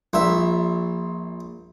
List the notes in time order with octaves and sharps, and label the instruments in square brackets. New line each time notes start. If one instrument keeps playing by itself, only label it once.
[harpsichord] A#1 E5